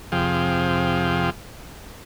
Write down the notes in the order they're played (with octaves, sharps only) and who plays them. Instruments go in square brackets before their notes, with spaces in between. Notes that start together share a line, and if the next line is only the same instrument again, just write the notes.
[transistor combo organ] F2 C3 F3 G#4 F5 G5